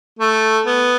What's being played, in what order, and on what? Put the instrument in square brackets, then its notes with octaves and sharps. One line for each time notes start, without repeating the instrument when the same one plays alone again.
[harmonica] A3
B3